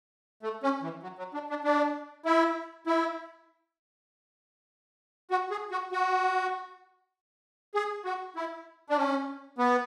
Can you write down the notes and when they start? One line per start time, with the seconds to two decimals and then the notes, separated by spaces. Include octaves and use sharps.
0.43 A3
0.63 C#4
0.83 E3
1.03 F#3
1.19 F#3
1.34 D4
1.50 D4
1.64 D4
2.25 E4
2.87 E4
5.30 F#4
5.51 G#4
5.71 F#4
5.92 F#4
7.75 G#4
8.05 F#4
8.36 E4
8.90 D4
8.97 C#4
9.58 B3